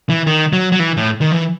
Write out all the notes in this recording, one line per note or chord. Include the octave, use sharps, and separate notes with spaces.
E3
D#3
F#3
F#3
E3
A2
D#3
E3